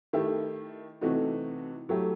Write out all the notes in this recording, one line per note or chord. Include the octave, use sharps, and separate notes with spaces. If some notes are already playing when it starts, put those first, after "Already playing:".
D#3 A3 E4 G4
C3 E3 A3 D#4 F#4
F#3 A3 E4 G4